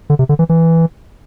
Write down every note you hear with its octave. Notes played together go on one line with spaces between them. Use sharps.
D3
C3
D3
E3
E3